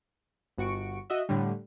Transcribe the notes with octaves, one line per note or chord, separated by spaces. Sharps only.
G1 F#4 C#6 D7
F#4 D#5 E5
A2 D3 G3